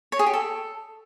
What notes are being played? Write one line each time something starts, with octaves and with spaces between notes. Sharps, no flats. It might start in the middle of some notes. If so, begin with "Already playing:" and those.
C#5
G#4
G4
A4